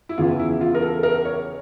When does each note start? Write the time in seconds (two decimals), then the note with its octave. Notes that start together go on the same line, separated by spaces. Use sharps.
0.09 E4
0.18 E2 C#3 E3 F4
0.39 E4
0.61 F4
0.74 A#4
0.82 A4
1.03 A#4
1.25 C#5